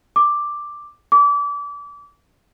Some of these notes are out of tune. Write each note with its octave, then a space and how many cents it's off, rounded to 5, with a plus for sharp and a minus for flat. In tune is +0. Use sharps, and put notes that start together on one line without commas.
D6 +5
D6 -30